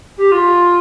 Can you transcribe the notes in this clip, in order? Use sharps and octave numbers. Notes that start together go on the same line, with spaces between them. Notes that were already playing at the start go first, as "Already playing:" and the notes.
G4
F4